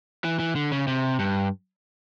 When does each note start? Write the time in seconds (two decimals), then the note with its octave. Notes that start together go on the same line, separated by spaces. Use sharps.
0.25 E3
0.39 E3
0.56 D3
0.72 C#3
0.87 C3
1.19 G2